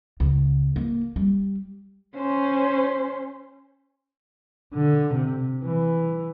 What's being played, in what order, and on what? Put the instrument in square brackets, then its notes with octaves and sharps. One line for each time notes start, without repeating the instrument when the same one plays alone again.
[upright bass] C#2
A#3
G3
[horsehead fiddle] C#4 C5
[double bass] D3
C3
E3